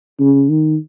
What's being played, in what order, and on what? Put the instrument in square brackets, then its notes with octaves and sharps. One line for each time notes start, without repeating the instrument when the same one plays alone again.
[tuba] C#3
D#3